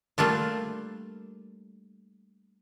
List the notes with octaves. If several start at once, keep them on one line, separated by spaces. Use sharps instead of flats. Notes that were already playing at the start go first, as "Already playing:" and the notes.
G3 A3 A#3 D4 F4